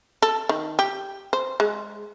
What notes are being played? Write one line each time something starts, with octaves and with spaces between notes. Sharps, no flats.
A4
D#3
G4
C5
G#3